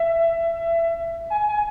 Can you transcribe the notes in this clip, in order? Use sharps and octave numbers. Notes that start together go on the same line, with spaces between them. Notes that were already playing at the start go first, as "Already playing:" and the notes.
Already playing: E5
G#5
G#5